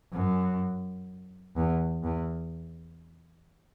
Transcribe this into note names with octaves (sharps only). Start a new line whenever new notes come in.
F#2
E2
E2